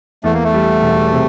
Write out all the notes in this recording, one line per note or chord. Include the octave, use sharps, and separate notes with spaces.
E2 A3
A#3
A3
G3
E1
C3